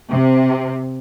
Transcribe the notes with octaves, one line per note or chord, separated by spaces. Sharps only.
C3